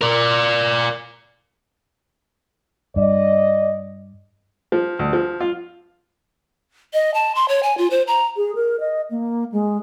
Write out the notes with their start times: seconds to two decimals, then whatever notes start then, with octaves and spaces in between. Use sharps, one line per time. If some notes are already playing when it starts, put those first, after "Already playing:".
0.01 A#4 D5
2.96 G2 D5 D#5
4.72 F3
4.99 D2
5.13 F3
5.40 F4
6.93 D#5
7.14 A5
7.35 C6
7.48 C#5
7.63 G#5
7.78 F4
7.90 C5
8.07 A#5
8.37 G#4
8.55 A#4
8.80 D#5
9.11 A#3
9.52 G#3